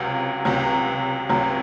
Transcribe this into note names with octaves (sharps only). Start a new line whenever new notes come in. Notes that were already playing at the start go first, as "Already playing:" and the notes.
Already playing: C#2 C3 F#3 F5
C#2 C3 F#3
C#2 C3 F#3